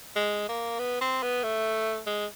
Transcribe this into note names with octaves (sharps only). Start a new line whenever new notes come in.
G#3
A#3
B3
C4
B3
A3
G#3